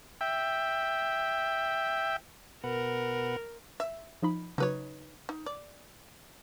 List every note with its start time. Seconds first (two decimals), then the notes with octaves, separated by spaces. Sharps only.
0.21 E5 G5
2.64 B2 A#4 B4 F#5
3.80 E5
4.22 F3 D#4 B5
4.58 C#3 F#3 D#4 B4 C#5
5.29 D#4
5.46 D5